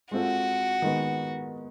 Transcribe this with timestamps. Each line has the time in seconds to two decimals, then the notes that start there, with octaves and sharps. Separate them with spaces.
0.11 G#3 C4 F4 F#4 A4
0.82 D#3 G#3 B3